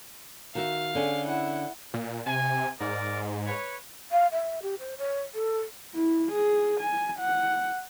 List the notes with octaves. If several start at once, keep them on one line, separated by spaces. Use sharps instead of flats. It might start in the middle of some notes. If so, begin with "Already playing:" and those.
D#3 F#4 E5 F5
D3 C#4 G#4
E4 F#5
A#2
C3 G#5
G#2 A#4 D5
B4 C#5
F5
E5
G4
C5
C#5
A4
E4
G#4
G#5
F#5